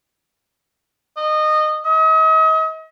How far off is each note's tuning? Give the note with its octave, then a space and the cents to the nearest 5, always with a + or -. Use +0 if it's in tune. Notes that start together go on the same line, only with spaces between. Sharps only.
D#5 -20
D#5 +40